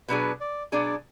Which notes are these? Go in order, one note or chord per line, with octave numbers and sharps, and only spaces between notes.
B2 F#3 D4 G#4 B4
D5
B2 F#3 D4 G#4 D5